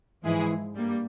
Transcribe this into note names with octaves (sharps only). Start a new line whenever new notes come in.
G#2 E3 F3 G#3 E4 G#4
G2 G3 A#3